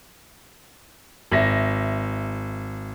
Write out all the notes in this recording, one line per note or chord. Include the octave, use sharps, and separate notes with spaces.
G#1 E5 A#6